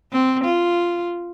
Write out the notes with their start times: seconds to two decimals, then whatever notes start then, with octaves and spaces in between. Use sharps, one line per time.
0.12 C4
0.44 F4